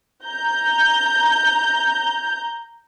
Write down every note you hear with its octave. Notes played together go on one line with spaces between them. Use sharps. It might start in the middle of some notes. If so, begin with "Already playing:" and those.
A#5 G6